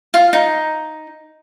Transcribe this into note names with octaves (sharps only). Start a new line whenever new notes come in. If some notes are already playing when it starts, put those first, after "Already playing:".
F4
D#4